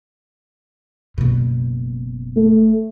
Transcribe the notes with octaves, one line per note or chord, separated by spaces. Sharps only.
F#1 B2
A3